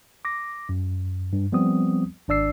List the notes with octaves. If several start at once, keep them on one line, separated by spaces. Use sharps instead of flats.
D6 A#6
F#2
G2
F3 G3 B3 C4 D#6
G#1 D4 D5 E6 C7